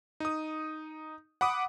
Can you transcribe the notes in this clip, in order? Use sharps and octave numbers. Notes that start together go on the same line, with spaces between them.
D#4 D#6
F#5 B5 D6 D#6